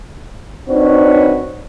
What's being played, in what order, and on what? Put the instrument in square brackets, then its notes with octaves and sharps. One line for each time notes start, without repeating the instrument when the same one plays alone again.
[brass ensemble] C4 D4 D#4 F#4 B4 C#5